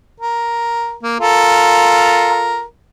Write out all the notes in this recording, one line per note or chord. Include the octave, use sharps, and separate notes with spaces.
A#4
A#3
F4 A4 A#4